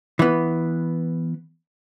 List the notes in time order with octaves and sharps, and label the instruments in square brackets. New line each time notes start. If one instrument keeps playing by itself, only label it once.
[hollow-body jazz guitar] E3 B3